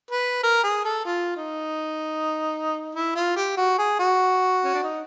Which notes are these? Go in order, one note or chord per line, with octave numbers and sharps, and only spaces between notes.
B4
A#4
G#4
A4
F4
D#4
E4
F4
G4
F#4
G#4
F#4
C#4
D4
D#4